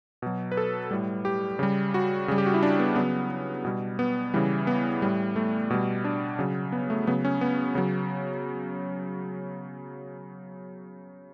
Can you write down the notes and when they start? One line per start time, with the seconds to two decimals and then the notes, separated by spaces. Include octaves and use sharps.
0.22 B2 F#3
0.52 B4
0.57 A4
0.91 A2 G3
1.25 G4
1.59 C#3 G3
1.94 F#4
2.28 C#3 G3
2.38 G4
2.46 F#4
2.54 E4
2.63 D4
2.79 B3
2.96 C#3 F#3 B3
3.65 B2 G3
3.99 B3
4.34 C#3 E3 G3
4.67 B3
5.02 A2 G3
5.36 A3
5.70 B2 G3
6.04 D4
6.39 C#3 F#3
6.72 B3
6.90 A3
7.07 C#3 F#3 B3
7.25 C#4
7.41 B3
7.75 C#3 F#3